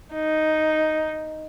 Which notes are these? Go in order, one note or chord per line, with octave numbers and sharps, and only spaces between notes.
D#4